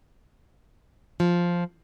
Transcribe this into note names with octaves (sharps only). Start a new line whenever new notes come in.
F3